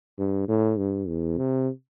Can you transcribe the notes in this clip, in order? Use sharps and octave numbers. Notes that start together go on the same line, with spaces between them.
G2
A2
G2
E2
C3